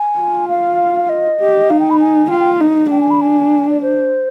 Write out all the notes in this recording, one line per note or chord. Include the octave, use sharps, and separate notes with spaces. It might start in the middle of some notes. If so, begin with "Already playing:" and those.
Already playing: G#5
F4
F5
D#5
G4
D#4 F5
G5
B5
G#5
F4 G5
G5
D#4
D4 G5
G#5
B5
G#5
D5
C5